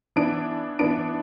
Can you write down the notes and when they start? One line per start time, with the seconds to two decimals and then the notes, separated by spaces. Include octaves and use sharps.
0.16 E3 B3 D4 D7
0.79 E3 B3 D4 D7